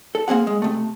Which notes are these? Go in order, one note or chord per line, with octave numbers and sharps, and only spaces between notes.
A4
A#3 C4 G#4 F#5
G#3
C3 A3